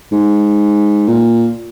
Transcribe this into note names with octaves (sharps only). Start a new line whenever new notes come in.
G#2
A#2